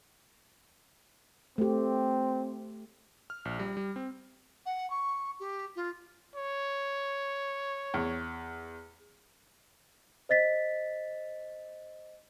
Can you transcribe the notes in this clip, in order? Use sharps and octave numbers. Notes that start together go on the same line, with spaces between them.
A3 C4 G4
F6
A#1
G3
G3
C4
F#5
C#6
G4
F4
C#5
E2
C5 D#5 A6 B6